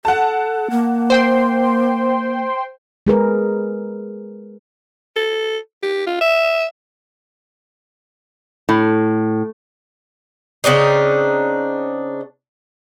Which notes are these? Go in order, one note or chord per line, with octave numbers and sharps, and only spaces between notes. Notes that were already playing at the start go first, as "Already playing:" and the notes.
A4 F#5 A5
A#3
C5 G5 C6
G#3 G#4 A#4 B4
A4
G4
F4
E5
A2
C#3 C4 D4 D#4